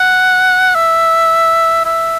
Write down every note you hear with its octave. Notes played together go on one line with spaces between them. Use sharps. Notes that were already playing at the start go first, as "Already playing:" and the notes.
Already playing: F#5
E5
E5